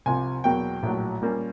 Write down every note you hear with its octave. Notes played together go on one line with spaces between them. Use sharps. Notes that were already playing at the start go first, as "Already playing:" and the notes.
C2 C3 F3 G#5
E2 B2 F#3 A#3 G5
A#1 A2 F#3
A#2 G3 A#3 C#4